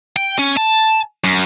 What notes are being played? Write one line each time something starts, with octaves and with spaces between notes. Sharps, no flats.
G5
C#4
A5
F#2